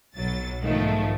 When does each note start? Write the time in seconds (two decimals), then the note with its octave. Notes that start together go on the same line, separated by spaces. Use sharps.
0.17 B1 F#3 A6
0.60 B1 G#2 D#3 F3 A3